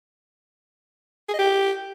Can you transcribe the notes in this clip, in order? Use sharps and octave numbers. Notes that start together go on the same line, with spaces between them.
G#4
D#5
G4